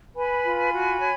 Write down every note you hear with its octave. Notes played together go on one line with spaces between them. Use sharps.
B4 G#5 B5
F4
F#4
C#5